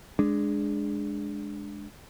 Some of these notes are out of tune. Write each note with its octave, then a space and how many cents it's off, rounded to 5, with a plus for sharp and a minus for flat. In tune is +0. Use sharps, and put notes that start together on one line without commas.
G#3 +0 D4 +0